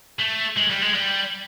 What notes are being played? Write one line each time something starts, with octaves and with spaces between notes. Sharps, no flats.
A3
G#3
G3
G#3
G3